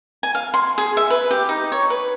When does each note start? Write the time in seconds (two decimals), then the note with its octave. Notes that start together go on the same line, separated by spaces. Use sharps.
0.23 G#5
0.35 F5
0.54 C6
0.78 G#4
0.97 E5
1.10 B4
1.31 G4
1.49 D#4
1.72 C#5
1.90 B4